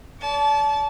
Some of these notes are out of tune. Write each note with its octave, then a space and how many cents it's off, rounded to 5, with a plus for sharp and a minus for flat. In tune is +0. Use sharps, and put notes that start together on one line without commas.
D5 -40 A5 -20